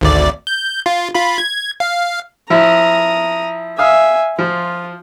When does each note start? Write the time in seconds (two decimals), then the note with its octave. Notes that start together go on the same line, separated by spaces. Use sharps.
0.01 G#1 D2 D5
0.47 G6
0.86 F4
1.14 F4 B5
1.38 G#6
1.80 F5
2.50 F3 E4 A#5 D#6
3.78 E5 F5 G#5 D#6
4.38 F3 F4